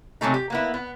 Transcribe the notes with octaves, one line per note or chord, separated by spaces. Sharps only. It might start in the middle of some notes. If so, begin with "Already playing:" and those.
C3 F#3 G#3 A3 D#4
G4
A#3 B3 E4
B3